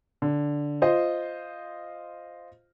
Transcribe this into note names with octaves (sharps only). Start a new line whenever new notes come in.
D3
F4 C5 D#5